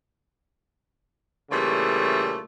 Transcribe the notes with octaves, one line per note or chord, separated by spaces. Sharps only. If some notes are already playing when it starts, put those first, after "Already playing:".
A#2 C#3 E3 G3 A3